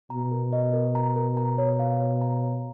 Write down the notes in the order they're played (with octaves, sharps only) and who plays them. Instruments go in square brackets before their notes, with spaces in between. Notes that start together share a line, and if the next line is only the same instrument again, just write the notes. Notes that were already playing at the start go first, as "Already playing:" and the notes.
[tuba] B2 [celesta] A#5
[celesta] A#4
D#5
A#4
A#5
A#4
A#5
C#5
F5
C#5
A#5
C#5